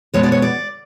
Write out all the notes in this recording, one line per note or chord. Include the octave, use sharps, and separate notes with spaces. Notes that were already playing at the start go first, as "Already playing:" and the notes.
B2 G#3 B3 C#5
D5
C#5
D5